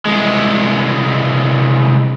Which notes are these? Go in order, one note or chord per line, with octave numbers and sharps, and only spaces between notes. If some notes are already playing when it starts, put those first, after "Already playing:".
C2 G#3